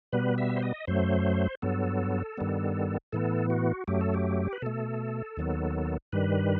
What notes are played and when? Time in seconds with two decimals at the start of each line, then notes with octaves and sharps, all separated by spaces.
0.13 B2 G3 B3 B4
0.38 E5
0.56 C5
0.63 D#5
0.87 F#2 F#3 A3 C5
1.62 G2 F#3 B3 A4
2.38 G2 D#3 G3 B3
3.12 A2 E3 B3 A4
3.50 F#4
3.87 F#2 F#3 A3 G4
4.01 A4
4.14 G4
4.53 B4
4.62 B2 A3 A4
5.37 D#2 D#3 F#3 B3
6.12 G2 D#3 G3 B4